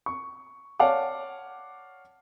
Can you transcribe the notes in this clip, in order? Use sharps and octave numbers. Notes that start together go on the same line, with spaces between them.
C#6
C#5 D5 F5 F#5 A5 D6